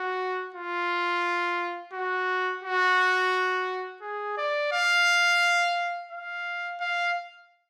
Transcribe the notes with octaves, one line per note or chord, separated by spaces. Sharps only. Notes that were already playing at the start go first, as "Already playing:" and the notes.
Already playing: F#4
F4
F#4
F#4
G#4
D5
F5
F5
F5